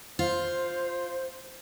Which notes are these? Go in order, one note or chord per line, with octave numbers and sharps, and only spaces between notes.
F4 C5